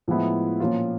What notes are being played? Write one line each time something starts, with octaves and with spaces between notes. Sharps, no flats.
A2 F3 G#3 B3 E4
A#2 F3 A#3 C#4 F4